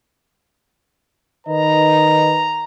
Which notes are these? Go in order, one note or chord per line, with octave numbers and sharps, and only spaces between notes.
D#3 B4 D#5 A#5